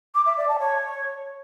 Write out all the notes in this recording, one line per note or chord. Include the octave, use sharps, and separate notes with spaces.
D6
E5
D5
A5
C#5